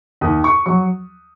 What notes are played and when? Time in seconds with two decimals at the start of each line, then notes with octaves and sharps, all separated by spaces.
0.21 D#2 D#6
0.44 C#6
0.66 F#3 C#6